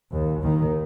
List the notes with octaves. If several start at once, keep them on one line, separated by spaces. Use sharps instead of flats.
D#2
D#2 D#3